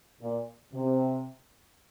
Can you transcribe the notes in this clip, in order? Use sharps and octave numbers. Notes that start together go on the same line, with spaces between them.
A#2
C3